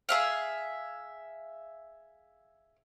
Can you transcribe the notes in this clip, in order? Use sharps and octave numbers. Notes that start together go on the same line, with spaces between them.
G#4 E5 F5